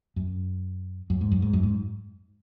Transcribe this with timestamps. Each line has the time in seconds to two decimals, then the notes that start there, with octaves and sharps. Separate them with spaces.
0.16 F#2
1.10 F#2
1.21 G#2
1.32 F#2
1.42 G#2
1.53 F#2
1.63 G#2